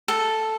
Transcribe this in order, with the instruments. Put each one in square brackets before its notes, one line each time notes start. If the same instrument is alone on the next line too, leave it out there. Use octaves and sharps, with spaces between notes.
[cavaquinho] A4